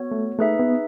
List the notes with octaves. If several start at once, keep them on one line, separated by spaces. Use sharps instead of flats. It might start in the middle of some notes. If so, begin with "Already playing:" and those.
Already playing: B3 F#4 C#5
A3
A3 D#4 G#4 B4 E5
B3